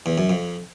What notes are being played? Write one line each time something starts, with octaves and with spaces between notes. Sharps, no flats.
E2
F#2
F2